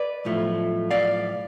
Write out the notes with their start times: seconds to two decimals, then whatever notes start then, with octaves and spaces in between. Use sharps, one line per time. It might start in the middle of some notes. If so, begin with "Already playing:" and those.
Already playing: B4 D5
0.25 B1 A2 F3 A3
0.91 D5 F5